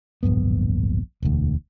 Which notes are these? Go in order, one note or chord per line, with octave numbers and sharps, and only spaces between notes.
D1 A#1 G2 B3
E1 D2